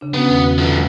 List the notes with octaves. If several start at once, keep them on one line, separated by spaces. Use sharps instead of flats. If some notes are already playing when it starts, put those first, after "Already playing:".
C#3 D4
B3 C#4 F#4
E2 D#3
B4
D3 F3
G#3